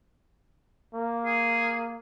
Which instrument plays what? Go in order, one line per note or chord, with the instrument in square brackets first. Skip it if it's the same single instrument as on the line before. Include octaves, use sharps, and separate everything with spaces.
[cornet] A#3
[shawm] G#4